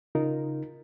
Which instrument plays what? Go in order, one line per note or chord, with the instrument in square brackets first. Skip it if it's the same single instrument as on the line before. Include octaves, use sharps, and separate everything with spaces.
[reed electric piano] C#3 D#4 F4 A#4